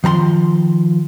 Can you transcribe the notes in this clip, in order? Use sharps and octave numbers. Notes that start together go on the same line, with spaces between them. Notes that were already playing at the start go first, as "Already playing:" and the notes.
D#3 F3 A#5 C6